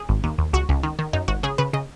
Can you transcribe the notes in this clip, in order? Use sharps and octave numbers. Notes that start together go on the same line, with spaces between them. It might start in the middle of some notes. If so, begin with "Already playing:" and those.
Already playing: G#4
G#1
D#2
D#2
C#2 F#4
C#2
D#3
D#3
F#2 D#4
G#1 F#4
C#3 G#4
C#3 B4
C#3 D#5